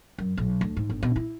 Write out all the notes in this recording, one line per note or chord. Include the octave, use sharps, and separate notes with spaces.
F#2
B1
D2
G#2
G1
B2
E4